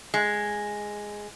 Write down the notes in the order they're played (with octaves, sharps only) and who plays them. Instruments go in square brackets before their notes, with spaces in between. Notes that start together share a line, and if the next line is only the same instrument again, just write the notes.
[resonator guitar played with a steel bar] G#3